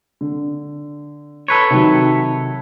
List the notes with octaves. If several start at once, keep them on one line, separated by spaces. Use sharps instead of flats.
D3
A4 B4 C#5
C3 D#3 F#3